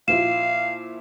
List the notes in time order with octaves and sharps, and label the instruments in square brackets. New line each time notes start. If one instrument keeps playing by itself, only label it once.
[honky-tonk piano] A#2 F3 E4 [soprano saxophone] F5 [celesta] E7